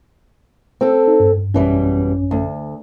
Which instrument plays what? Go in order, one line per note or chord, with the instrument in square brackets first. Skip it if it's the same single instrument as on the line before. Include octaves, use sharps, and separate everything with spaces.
[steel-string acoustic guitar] C4 A4
[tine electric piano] D#4
G2
[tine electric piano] A1 F#2 C#4 [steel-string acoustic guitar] B2 E3 G3
[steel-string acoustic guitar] D2